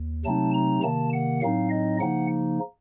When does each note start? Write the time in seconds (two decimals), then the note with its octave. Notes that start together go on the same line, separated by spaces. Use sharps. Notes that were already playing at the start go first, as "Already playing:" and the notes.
Already playing: D#2
0.25 C3 F#3 A3 C4 D#4 A5
0.54 A#5
0.83 C3 D#3 A#3 A5
1.13 F#5
1.42 A2 F#3 C4 D#4 F5
1.71 D#5
2.00 C#3 F3 A#3 D#4 F#5